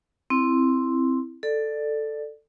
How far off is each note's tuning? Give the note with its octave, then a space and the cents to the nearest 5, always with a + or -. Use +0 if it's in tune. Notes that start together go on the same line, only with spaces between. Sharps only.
C4 +0 E4 +0
A4 +5 D5 +15